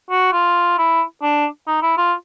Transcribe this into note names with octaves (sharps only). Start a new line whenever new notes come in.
F#4
F4
E4
D4
D#4
E4
F4